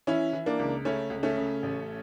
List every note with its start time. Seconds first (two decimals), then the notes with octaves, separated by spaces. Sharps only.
0.07 E3 C#4 E4
0.33 E3
0.46 A#3 D4
0.59 C#2
0.85 C#3 A3 C#4
1.10 C#2
1.23 A3 C#4
1.37 C#3
1.63 A1